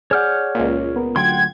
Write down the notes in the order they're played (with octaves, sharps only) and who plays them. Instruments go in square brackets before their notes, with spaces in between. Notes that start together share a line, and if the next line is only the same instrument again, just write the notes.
[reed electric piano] G#4 D5 F#5 [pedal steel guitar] C#5 F6 G6
[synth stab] C#2 A#2
[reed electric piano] B3 A#4
[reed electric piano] D3 F#3 A3 [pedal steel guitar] F#5 G5 C6 [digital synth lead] G#6